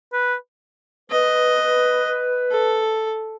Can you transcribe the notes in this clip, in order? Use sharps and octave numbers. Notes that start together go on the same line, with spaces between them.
B4
B4 D#5
A4